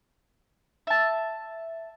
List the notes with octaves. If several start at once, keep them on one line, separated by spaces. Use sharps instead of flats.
E5 A5